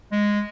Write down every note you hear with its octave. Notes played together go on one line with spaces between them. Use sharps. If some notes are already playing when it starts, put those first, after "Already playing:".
G#3